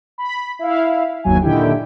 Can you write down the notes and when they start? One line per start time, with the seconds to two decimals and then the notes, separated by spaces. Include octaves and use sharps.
0.18 B5
0.59 E4 E5 F5
1.24 G1 D#2 F#3 G#5
1.41 A#2 D3 D#3 E4 G4 G5